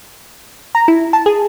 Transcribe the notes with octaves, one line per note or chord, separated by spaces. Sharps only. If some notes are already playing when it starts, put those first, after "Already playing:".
A#5
E4
A5
G#4